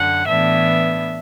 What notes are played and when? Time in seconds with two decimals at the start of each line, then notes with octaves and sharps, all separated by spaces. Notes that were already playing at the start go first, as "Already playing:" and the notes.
Already playing: F#2 D3 F#5
0.27 A2 E3 B3 D4 E5